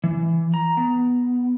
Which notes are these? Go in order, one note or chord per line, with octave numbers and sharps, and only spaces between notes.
E3
A#5
B3